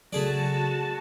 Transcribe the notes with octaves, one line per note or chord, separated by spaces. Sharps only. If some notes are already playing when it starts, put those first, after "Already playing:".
C#3 F#3 A3 F#4 G#4 D5 A5